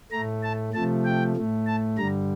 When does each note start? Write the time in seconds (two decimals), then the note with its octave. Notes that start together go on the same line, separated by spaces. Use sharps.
0.12 A2 A3 A#5
0.43 A5
0.74 C3 F3 A3 A5
1.05 G5
1.36 A2 A3
1.67 A5
1.98 G2 D3 G3 A#5